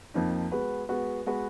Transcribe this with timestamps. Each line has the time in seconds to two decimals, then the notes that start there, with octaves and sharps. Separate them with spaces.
0.14 F2 F3 A#3 D#4
0.51 G#3 B3 F#4 B4
0.89 G#3 B3 F#4 B4
1.26 G#3 B3 F#4 B4